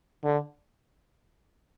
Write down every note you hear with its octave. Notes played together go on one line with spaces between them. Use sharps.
D3